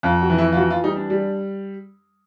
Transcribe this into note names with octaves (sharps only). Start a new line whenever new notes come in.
F2 F4
F#4
E3
E4
F4
E3 F#4
F4
G3 D#4
D4
G3